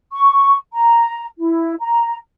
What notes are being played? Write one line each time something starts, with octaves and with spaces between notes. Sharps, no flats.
C#6
A#5
E4
A#5